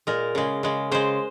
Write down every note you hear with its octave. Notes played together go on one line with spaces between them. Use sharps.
A#2 G#3 A#4
C#3 G#3
C#3 G#3
C#3 G#3 C5